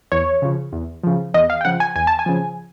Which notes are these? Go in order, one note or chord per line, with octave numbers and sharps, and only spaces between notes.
E2 C#5
C#3 F3
E2
C#3 F3
E2 D#5
F5
G5
C#3 F3 F#5
G#5
E2 G#5
A5
G#5
C#3 F3